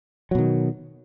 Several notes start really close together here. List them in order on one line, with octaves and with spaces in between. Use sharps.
F#3 B2 D#3